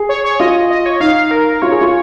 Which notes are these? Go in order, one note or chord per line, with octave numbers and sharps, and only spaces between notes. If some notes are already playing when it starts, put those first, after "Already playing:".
Already playing: G#4
C#5
C#5
F4 D#5
D#5
C#5
D#4 F5
A#4
F4 C#5
G#4
F4